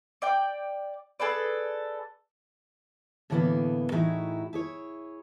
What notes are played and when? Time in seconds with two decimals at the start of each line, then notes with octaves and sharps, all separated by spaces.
0.22 D5 G5 D6
1.20 G#4 A4 B4 D5
3.30 A2 D3 E3 G#3 A#3 B3
3.92 A2 E3 D#4 E4 F#4 G#4
4.53 E4 G#4 C#5